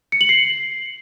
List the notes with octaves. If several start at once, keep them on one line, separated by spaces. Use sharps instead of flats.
C#7
F#7
C7